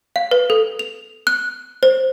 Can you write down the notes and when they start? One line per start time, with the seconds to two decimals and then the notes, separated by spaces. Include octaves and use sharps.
0.16 F5
0.31 B4
0.50 A4
0.79 F7
1.27 F#6
1.83 C5